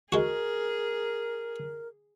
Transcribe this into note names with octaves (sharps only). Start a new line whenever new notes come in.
G#3 F#4 G#4 A#4